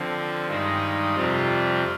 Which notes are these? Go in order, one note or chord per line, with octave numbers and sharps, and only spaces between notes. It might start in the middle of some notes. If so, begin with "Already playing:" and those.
Already playing: D3 F3 C4
G2 D#3 G#3 D#4
F2 C3 G3 C4 F4